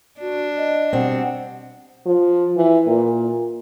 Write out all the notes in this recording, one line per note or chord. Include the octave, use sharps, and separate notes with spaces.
D4 F#4
D#5
B2 G3 C4 F#5
F3
E3
A#2